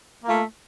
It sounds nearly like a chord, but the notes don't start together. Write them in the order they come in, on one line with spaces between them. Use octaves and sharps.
A#3 A3 F4